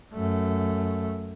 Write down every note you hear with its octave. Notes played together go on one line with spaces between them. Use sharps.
F#2 A3